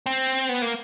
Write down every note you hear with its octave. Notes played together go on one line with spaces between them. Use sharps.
C4
B3
A#3